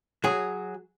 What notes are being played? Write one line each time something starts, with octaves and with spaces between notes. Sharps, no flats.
F#3 G#4